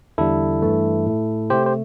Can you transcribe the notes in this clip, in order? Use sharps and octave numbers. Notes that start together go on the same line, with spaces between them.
E2 D3 G3 E4 A4
G2 E3 A3
A2 A3
C3 A3 G4 C5
C5